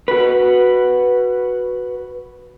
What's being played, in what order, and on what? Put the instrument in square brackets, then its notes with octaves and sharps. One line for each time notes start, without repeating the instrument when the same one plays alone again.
[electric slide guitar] F#4 B4